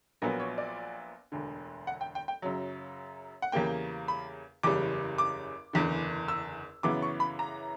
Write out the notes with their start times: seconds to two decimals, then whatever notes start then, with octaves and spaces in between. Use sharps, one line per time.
0.22 A#1 A#2 F#3 B3 A#4
0.40 C#5
0.58 D5
1.32 E1 D2 D3
1.87 F#5
2.01 G5
2.15 G5
2.28 G5
2.42 F#2 C#3 F#3
3.42 F#5
3.52 E2 C#3 G3 A#3 G5
4.08 B5
4.63 F#1 E2 C#3 G3 D6
5.18 D6
5.73 F#1 E2 D3
6.28 E6
6.83 F#2 C#3 E3 B3 D6
7.02 C#6
7.20 B5
7.39 A#5